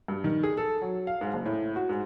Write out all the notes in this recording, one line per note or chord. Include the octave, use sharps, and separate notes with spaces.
G2
D#3
G#4
A4
F#3
F5
G#2
F#1
A2
F#4
G#2